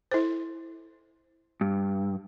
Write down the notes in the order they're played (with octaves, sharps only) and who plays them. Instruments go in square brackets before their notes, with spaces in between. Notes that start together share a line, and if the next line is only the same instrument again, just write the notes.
[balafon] E4 A4 C5
[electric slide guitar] G2